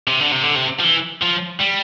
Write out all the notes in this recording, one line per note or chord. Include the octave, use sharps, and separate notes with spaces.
C3
D3
C3
D3
C3
F3
E3
F3
G3